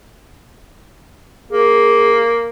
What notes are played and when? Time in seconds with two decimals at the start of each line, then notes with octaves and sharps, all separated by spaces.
1.51 A#3 G#4